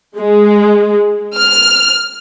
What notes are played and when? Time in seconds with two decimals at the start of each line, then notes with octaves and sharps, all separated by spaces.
0.18 G#3
1.38 F6